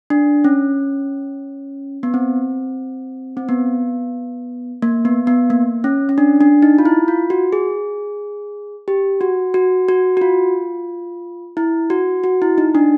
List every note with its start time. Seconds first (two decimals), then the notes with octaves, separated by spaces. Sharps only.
0.10 D4
0.44 C#4
2.03 B3
2.14 C4
3.37 C4
3.49 B3
4.82 A#3
5.05 B3
5.27 B3
5.50 A#3
5.84 C#4
6.09 C#4
6.18 D4
6.41 D4
6.62 D#4
6.78 F4
6.85 E4
7.08 F4
7.30 F#4
7.53 G#4
8.88 G4
9.21 F#4
9.54 F#4
9.89 F#4
10.17 F#4
10.21 F4
11.57 E4
11.90 F#4
12.24 F#4
12.42 E4
12.58 D#4
12.75 D4